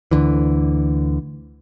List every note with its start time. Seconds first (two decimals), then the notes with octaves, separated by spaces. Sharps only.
0.11 D2 D3 E3